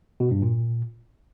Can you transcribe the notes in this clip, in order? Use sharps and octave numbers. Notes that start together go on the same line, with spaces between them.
B2
G2
A#2